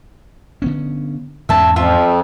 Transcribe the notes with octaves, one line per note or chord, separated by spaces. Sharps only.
D3 B3 C#4
E2 G#2 C#4 E5 A5
F2 F4 E5